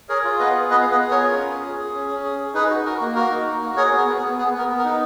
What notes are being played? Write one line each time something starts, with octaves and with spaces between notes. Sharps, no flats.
G#4 A#4 C#5
F4
B3 B4 D#5
G#4
B3 B4 D#5
B3 F5
B4 D#5
G#4
A#4 C#5
F4
C#4
G#4
G#4
G#4
C#4
C#4
G#4
G#4
D#4 G#4 B4
F#4
F#4 A#4
A#3
F#4 A#4
D#4
A#3
F#4
G#4 A#4 C#5
B3 A#4
B3
G#4
B3
B3 G#4
B3 A#4
B3
A#4
D#4